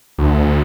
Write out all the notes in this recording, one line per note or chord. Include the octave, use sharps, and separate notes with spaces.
D2